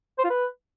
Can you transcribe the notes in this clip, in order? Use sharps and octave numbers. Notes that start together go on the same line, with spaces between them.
C5
F4
B4